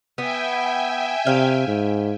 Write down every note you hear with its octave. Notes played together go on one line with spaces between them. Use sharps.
B3 E5 G5 G#5
C3 F5
G#2